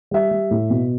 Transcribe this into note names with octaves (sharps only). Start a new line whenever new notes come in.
G3 E5
G3
A2
B2